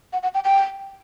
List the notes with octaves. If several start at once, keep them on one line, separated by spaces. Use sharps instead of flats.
F#5
F#5
G5
G5